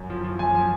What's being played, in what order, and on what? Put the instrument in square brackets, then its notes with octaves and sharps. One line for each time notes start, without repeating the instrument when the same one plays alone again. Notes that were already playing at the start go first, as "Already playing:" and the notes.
Already playing: [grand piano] F#2
F3
F3
F#2 G#5
F3